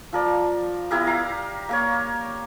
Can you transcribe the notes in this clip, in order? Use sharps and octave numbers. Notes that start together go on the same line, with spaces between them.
F3 A#4 D5
B3 E4 G4 A#4
A#4 F5 A#5
A#3 A#4 C#5